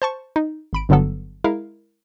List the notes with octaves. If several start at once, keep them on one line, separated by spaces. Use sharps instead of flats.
C5 A5 C#6
D#4
G#1 B5 D7
G1 G2 D3 F#3 B3 A4
G#3 E4 A#4 F5